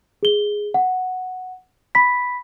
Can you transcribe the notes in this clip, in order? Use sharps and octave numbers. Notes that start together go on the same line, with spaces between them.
G#4 G7
F#5
B5 B6